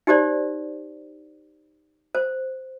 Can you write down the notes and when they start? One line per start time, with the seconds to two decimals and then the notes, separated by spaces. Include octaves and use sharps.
0.07 D#4 G4 C5 D5
2.15 C5